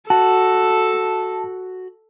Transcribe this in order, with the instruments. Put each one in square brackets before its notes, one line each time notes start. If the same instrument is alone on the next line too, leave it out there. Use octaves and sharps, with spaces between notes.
[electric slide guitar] F#4 [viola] A4 [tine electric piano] A5